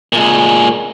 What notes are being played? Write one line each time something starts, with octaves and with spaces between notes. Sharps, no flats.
A#2 G#3